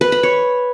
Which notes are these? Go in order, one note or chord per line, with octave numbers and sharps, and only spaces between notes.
B4
B5
C#5